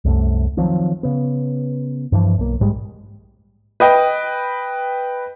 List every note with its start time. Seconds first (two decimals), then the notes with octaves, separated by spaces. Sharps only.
0.05 C2 F#2 A3
0.57 D#3 F3 F#3 C4
1.03 C#3 B3
2.12 G2 E3 F3
2.38 B1 A#3
2.60 A#1 G#2 G3 G#3
3.80 B4 D#5 G5